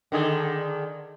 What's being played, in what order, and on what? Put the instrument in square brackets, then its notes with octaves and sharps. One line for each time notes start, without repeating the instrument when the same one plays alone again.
[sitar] D3 D#3 G#4